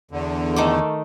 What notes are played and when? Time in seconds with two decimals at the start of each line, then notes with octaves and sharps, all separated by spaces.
0.11 E2 D3
0.56 D#3 A3 D6